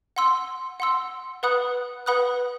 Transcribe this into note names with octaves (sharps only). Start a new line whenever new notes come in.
F#5 C6 E6
F#5 C6 E6
B4 F#5 B5 D#6 F#6
B4 F#5 B5 D#6 F#6